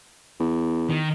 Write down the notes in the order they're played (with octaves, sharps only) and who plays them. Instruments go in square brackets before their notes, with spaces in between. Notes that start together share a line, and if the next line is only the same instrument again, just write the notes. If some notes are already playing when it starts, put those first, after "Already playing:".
[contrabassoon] E2
[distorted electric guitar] D#3